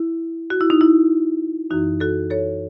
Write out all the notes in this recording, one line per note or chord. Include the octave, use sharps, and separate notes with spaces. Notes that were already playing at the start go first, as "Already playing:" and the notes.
Already playing: E4
F#4
E4
D#4
E4
F#2 E3 D#4 F#4
F#4 A4
A4 C#5